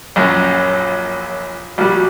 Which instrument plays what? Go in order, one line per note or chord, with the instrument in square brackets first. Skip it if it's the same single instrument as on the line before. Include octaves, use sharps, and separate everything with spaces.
[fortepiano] A#1 F#2 [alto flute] C#5
[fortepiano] A#1 G3 [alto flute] F#4